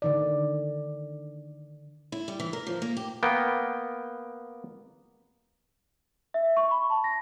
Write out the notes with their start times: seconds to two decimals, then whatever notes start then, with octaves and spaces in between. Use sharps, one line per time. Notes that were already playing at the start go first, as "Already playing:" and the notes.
0.02 D3 D#3 D5
2.12 E4
2.28 G3
2.40 E3
2.53 A#4
2.67 F3
2.82 A#3
2.97 G4
3.23 A#3 B3 G5
6.34 E5
6.57 C#6
6.71 B5
6.90 A5
7.04 A#6